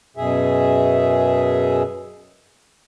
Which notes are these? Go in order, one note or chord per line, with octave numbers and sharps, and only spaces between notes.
F#2 B2 G#4 E5